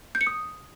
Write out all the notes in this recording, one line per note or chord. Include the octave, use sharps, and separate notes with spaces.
G6
C#7
D#6